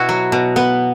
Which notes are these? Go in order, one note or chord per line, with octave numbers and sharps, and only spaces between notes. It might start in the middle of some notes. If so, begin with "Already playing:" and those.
Already playing: B2 B3 E4 F#4
F#3
B2
B3